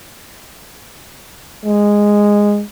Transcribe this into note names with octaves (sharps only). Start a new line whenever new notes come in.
G#3